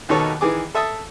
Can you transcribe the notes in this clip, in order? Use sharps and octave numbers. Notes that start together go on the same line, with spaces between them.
D#2 B2 D#3 A4 C#5
D#3 E3 G#4 D6
A4 E5 A5 D#6